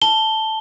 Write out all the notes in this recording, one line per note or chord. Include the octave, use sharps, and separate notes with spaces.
A5 G7